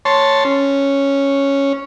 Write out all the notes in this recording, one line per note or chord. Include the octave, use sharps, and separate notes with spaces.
C#5 A5 C6
C#4